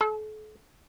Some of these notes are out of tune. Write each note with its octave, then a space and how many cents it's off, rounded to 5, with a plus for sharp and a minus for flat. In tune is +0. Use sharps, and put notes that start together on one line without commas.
A4 -40